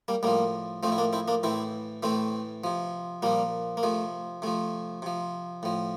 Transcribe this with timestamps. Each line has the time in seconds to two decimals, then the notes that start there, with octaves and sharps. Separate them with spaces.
0.08 G3 A#3
0.23 A2 F3 G3 A#3
0.83 F3 A3 C4
0.87 A2 E4
0.98 A#3 D4
1.13 C4 E4
1.28 A#3 D4
1.43 A2 E3 C4 E4
2.03 A2 E3 A3 C4
2.64 C3 F3
3.22 A#2 F3 G3 A#3
3.77 A#3
3.83 C3 F3 A3
4.42 C3 F3 A3
5.02 C3 F3
5.63 A2 F3